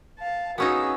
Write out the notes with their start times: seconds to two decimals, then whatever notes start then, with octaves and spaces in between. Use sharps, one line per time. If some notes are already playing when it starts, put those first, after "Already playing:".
0.19 F5 A5
0.58 B3 C#4 D#4 F#4 G#4 E6